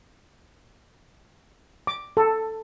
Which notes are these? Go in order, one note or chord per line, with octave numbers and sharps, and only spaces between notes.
D6
A4